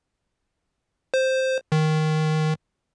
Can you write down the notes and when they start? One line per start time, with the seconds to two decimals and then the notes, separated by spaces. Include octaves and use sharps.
1.14 C5
1.72 D#3